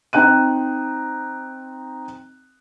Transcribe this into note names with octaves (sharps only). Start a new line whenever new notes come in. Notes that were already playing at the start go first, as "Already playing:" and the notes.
C4 D#4 G5 F#6 D#7